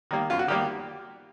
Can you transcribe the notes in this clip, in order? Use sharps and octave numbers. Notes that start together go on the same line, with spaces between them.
D#3 G3 A#3
F#2 F4
F#4
D#3 G3 A#3 G4